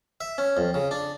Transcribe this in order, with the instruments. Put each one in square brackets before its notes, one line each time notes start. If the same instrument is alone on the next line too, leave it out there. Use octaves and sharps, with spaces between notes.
[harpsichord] E5
C#4
F2
C#3
D4